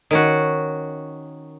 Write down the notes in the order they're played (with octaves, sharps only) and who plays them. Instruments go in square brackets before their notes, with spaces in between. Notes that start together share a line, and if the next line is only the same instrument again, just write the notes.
[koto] D#3 C#4 F#4